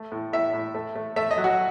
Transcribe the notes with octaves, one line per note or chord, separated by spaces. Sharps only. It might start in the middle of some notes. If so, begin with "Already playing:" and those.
Already playing: A3
A2
A2 E5
A2
A3
A3
A3 E5
D#5
F#3
F#4